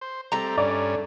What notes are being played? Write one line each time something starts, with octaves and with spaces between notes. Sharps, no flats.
C5
G3 A3 C4 A#5
G2 C#4 D5